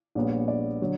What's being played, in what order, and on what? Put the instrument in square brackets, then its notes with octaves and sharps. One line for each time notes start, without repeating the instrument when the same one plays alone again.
[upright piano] A#1 A#2 G3 B3 C#5
D5
D3 F#3